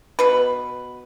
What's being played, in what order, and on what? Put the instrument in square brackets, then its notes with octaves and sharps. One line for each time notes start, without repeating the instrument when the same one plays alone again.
[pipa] B2 B4